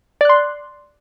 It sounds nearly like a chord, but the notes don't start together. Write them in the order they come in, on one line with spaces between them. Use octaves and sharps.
D5 F#6 C6